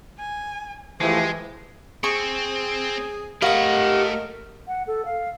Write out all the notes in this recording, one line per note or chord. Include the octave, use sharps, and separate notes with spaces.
G#5
E3 F3 G#3 A3 G4
C4 G#4 C#6
A3 G4 A#4 D#5 F5 F#5 B5
F#5
A4
F5